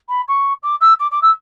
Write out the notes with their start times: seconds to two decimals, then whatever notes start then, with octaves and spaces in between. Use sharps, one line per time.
0.09 B5
0.28 C#6
0.63 D6
0.81 E6
0.99 D6
1.11 D6
1.22 E6